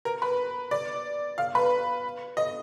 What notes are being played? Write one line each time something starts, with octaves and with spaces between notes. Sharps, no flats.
A#4
B4
D5
F5
B4
D#5